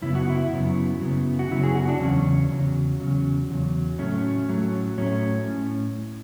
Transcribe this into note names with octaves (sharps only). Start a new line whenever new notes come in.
F#2 C#3 F#3 B3 E4
F#4
E4
F#2 C#3 F#3 B3
F#2 C#3 F#3 B3
F#4
F#2 C#3 F#3 B3 E4
G#4
F#4
D4
E2 C#3 F#3 C#4
E2 C#3 F#3
E2 C#3 F#3
E2 C#3 F#3
A2 F#3 A3 C#4
A2 F#3 A3
A2 F#3 A3 C#4
A2